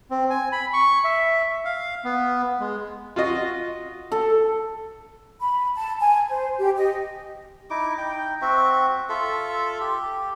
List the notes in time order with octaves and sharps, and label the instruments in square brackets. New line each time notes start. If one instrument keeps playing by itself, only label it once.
[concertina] C4
G#5
B5
C#6
E5
F5
B3
G#3
[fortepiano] F4 F#4 D#5
[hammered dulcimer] A4
[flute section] B5
A5
G#5
C5
G4
D#5
[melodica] D#4 E4 D6
D#4 G5
C4 F#4 E5
F4 A4 E5
G4